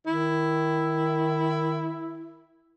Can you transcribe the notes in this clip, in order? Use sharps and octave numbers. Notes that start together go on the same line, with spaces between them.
D#3 E4